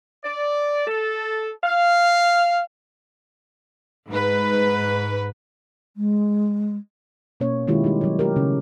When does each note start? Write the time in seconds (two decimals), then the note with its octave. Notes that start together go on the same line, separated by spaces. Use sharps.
0.23 D5
0.87 A4
1.62 F5
4.08 G#2 B4
5.97 G#3
7.40 B2 A#3 C#4 C#5
7.68 D#3 G#3 E4 F4 G4
7.84 G3 D#4 G4
8.01 F#3 C#5
8.19 A3 G4 A#4
8.36 C#3 C#4